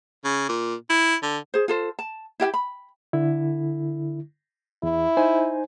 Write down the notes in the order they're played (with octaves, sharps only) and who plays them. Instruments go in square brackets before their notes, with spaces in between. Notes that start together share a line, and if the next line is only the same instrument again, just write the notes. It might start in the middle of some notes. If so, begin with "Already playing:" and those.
[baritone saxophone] C#3
A#2
E4
D3
[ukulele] G#4 C5
F4 A4 C5
A5
E4 G4 F5 G5
B5
[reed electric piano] D3 E4
[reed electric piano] E2 [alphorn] E4
[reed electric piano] D#4 C5 G#5